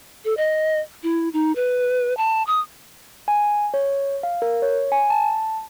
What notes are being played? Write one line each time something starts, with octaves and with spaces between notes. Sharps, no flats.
A4
D#5
E4
D#4
B4
A5
D#6
G#5
C#5
F5
A#4
C#5
G#5
A5